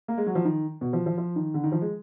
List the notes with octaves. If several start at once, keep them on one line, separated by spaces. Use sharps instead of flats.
A#3
G#3
F#3
F3
D#3
B2
F3
F3
F3
D#3
D3
D#3
F3
G#3